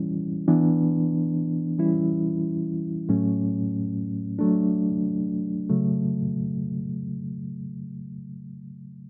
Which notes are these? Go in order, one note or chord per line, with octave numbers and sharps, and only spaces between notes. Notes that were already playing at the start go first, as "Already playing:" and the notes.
Already playing: E3 G3 C#4 E4
E3 B3 D4
E3 G3 C#4 E4
A2 F#3 A3 C#4
F#3 A3 D4
C#3 F#3 A3